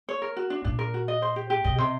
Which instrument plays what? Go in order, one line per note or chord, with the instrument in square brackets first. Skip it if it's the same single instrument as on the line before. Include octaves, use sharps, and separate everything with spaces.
[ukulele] C#5
A#4
F#4
D4
[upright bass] A#2 [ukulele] D4
[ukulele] A#4
F#4
D#5
C5
G4
G4
[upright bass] B2 [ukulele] D#5
[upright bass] C3 [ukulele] C5